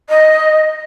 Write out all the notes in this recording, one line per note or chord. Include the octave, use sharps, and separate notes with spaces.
D#5